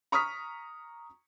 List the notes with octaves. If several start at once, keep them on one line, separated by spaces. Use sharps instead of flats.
A#5 C#6 D#6 F6 B6